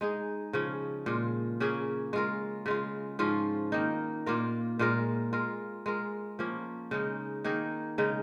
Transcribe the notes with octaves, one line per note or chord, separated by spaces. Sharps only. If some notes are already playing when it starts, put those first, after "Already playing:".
G#3 D#4 G#4
C#3 F3 C#4
A#2 G#3 F4
C#3 A#3 C#4 G#4
G#3 F4 A#4
C#3 G#3 F4
G#2 F3 C#4 F4
D#3 A#3 D#4
A#2 A#3 F4 A#4
A#2 G#3 F4 A#4
G#3 F4 A#4
G#3 F4 A#4
F3 A#3 C#4
C#3 G#3 D#4
D#3 A#3 D#4 G#4
C#3 G#3 D#4